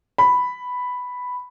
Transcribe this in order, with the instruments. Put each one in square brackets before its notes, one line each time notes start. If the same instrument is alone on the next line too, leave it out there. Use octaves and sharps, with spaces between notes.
[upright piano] B5